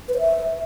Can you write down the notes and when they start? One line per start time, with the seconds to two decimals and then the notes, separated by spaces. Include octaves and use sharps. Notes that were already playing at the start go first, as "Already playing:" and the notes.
0.08 B4
0.14 C5
0.19 E5